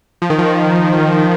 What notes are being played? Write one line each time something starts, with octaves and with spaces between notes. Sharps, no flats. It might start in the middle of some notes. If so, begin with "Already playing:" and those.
F3
D#3
F3